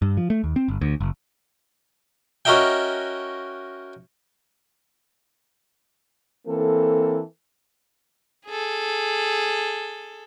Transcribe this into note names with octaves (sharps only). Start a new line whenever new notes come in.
G2
F3
A3
D#2
C4
G1
D2
F#1
C#4 F#4 A#4 D#5 E5 G5
E3 A#3 C4 A4
G#4 A4